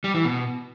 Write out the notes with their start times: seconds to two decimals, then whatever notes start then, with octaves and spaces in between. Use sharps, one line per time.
0.04 G3
0.14 E3
0.25 B2